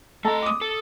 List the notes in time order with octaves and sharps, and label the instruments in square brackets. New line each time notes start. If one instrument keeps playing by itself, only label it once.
[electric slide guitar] A3 D#5 [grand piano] A4 A5 A#5
[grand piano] D6 D#6
[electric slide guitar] A4